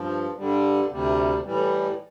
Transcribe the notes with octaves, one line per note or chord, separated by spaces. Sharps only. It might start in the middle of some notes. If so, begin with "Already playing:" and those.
Already playing: G2 F3
G2 D3 G3
D2 C3 G3
A2 E3 G3